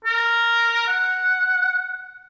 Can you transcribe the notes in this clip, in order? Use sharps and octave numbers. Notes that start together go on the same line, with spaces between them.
A#4
F#5